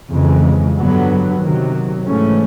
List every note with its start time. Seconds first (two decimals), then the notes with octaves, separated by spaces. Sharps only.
0.11 F2 C#3 E3 G#3
0.76 G2 D3 F#3 B3
1.40 C3 D#3 F#3
2.04 G#2 E3 A3 C#4